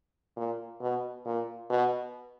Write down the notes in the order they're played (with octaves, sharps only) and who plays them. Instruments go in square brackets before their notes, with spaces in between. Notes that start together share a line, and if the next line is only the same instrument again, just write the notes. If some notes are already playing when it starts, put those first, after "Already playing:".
[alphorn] A#2
B2
A#2
B2